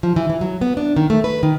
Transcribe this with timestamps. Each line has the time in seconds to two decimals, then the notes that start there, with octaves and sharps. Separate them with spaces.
0.03 F3
0.16 E3
0.30 E3
0.41 F#3
0.61 B3
0.77 D4
0.96 D#3
1.10 A3
1.24 B4
1.43 D#3